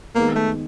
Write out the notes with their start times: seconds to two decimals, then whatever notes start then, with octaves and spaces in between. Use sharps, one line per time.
0.15 D#3 G#3 A#3 B3
0.36 A3